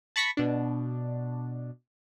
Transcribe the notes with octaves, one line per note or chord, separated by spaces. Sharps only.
A5 B5 C#6 A#6 B6
B2 D4